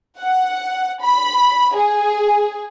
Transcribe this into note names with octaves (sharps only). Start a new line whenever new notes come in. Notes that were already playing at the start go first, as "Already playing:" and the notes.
F#5
B5
G#4